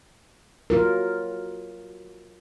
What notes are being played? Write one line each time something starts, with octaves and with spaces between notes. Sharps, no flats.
F#3 F4 A#4